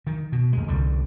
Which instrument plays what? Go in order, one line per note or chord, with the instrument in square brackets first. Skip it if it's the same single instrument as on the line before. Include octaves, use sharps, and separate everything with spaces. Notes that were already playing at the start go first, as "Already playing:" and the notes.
[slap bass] D#3
B2
D#2 G#3
C2 D3 G3